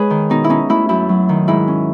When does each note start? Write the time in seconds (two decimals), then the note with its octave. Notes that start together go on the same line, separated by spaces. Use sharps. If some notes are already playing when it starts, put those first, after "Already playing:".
Already playing: G#3 G#4 B4 C#5
0.10 D#3
0.30 B2 D#4
0.44 E4
0.49 C#4 D#4
0.69 A3 E4
0.89 F#2 E4
1.09 F#3
1.29 D#3
1.48 G#2 E4
1.68 C#4